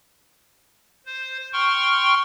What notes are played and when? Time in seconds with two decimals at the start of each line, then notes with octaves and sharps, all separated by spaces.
1.06 C5
1.53 G5 C6 C#6 F6